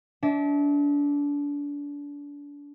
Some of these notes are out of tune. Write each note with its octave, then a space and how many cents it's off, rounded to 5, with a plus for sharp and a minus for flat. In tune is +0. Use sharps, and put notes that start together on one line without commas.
D4 -30 E5 -40